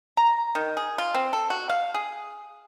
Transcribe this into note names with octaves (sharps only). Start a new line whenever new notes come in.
A#5
D#3
G#4
F4
C4
A4
F#4
F5
G#4